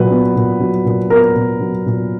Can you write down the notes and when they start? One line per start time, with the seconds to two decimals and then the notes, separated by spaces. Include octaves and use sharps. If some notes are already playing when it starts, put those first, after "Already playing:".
Already playing: A#2 F#3 B4
0.10 B3
0.36 A#2
0.60 F#3
0.85 A#2
1.10 B3 A#4
1.36 A#2
1.61 F#3
1.86 A#2